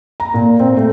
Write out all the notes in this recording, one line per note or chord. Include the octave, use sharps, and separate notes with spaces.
A#5
A#2
C4
A3